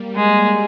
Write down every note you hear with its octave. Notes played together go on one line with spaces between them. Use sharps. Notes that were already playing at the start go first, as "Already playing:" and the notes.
Already playing: G3 A#3
G#3